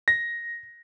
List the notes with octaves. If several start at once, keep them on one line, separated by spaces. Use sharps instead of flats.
A#6